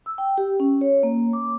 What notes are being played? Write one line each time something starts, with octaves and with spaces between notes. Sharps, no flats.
E6
G5
G4
C#4
C#5
A#3
D6